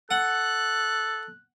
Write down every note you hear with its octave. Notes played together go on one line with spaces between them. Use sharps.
A4 F#5 F#6